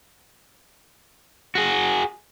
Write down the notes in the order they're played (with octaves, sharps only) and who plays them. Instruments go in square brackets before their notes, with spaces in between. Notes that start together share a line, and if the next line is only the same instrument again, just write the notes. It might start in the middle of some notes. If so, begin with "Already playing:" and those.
[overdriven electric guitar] F#4 G#4